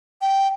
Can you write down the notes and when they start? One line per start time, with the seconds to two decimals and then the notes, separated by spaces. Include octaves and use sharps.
0.21 G5